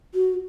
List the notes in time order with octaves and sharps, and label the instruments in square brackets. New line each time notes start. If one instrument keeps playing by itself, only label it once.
[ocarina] F#4